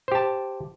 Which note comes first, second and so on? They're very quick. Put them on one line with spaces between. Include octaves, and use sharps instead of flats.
C5 G4 A5